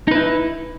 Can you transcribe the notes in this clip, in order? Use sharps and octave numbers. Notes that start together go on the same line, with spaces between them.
D#4 E4 B4